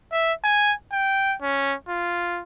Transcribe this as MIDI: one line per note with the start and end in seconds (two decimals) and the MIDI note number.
0.12 0.33 76
0.44 0.73 80
0.92 1.35 79
1.42 1.75 61
1.89 2.42 65